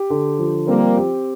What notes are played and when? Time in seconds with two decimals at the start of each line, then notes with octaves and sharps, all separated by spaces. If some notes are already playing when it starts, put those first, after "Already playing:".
Already playing: G4
0.10 D3
0.39 F3
0.67 G3 A#3 C4
0.97 G4